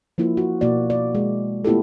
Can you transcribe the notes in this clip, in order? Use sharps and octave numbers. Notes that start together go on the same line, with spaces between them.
F3 A#3 E4 F4 A#4
F#4
B2 A#3 F#4 D5
D5
G#3
A3 B3 E4 F4 G4 A4